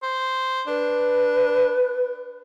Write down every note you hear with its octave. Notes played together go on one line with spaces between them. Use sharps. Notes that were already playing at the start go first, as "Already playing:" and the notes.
C5
D4 B4